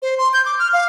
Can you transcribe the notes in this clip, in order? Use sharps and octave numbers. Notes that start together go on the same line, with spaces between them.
C5
C6
G6
D6
F6
F5